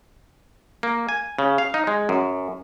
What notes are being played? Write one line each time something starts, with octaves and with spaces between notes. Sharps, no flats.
A#3
G#5
C#3
F5
D#4
G#3
F#2